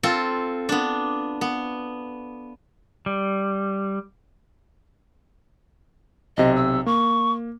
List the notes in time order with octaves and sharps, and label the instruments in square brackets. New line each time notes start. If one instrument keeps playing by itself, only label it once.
[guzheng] C4 F4 A4
B3 D4
B3
[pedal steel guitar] G3
[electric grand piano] B1 C3 [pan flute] D#5
[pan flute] E6
[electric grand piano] A#3 [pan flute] C#6